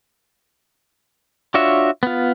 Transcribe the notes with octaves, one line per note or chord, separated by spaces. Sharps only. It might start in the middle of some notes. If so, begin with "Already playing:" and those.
D4 F4 F#4 C#5 E5
B3 F4